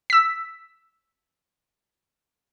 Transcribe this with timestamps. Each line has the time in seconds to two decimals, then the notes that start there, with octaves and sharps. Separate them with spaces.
0.10 E6 B6